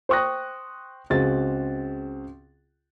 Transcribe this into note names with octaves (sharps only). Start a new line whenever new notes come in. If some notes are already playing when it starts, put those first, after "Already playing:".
C5 G5 C#6 D#6 F#6 A#6
C#2 C4 F#4 G#4 A6